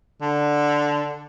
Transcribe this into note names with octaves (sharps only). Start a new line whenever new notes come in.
D3